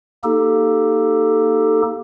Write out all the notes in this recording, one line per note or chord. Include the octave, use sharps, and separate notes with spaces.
A#3 D#4 G4 A4